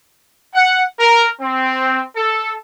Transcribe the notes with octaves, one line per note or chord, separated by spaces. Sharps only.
F#5
A#4
C4
A4